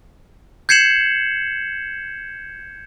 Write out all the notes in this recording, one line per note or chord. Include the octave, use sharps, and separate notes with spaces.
G6 G#6 C7 C#7 E7 F#7